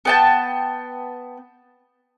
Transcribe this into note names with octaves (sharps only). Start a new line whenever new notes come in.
B3 G5 A5